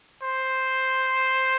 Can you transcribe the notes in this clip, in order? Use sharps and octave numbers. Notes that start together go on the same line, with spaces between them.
C5